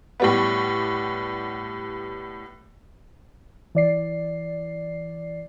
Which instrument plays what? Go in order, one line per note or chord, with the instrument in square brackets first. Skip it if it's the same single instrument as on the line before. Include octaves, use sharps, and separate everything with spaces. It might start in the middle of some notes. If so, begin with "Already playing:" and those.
[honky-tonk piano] A2 G3 B3
[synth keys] E3 D5 C7